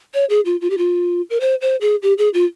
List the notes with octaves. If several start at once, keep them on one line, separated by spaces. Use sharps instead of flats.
C#5
G#4
F4
F4
G4
F4
A#4
C5
C5
G#4
G4
G#4
F4